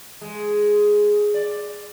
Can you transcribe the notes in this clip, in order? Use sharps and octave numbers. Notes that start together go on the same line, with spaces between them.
G#3
D5